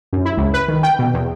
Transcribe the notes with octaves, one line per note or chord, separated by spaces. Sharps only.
F#2
E4
C#2
B4
D#3
G5
B2
E2